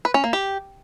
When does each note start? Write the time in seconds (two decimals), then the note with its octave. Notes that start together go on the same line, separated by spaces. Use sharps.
0.05 B4
0.14 C#4
0.24 A#3
0.33 G4